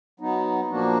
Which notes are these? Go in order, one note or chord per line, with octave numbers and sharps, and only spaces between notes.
F#3 B3 D#4
A#2 F3 A#3 D4 F#4